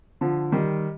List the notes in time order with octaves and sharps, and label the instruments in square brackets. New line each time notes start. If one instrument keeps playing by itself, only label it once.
[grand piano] D3 F3
D#3 G3